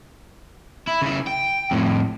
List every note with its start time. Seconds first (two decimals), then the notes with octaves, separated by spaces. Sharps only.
0.87 E4
1.02 C#3 E4
1.27 G5
1.71 F2 A2